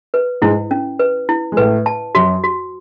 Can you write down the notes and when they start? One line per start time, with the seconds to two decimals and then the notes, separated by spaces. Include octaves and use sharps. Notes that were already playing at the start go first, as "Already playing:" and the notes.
0.14 B4
0.42 G#2 G#3 E4
0.71 C#4
0.99 B4
1.29 E4
1.52 G#3
1.57 A2 A3 B4
1.86 A5
2.15 F#2 F#3 F#4
2.44 F#4